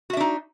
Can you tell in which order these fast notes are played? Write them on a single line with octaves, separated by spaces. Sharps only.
F#4 E5 D4 D#4